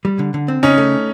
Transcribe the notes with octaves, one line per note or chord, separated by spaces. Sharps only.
G3
D3
D3
C4
C#3 C#4 D#4
A3